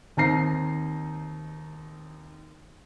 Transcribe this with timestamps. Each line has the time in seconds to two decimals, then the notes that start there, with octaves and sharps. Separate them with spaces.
0.17 D#2 C4 D#4 A#5 A#6 C7